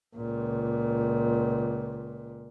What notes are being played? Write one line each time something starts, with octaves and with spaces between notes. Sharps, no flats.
C#2 A#2